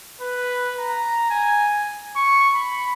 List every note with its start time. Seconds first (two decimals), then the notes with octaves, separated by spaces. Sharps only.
0.21 B4
0.78 A#5
1.30 G#5
2.16 C#6
2.54 B5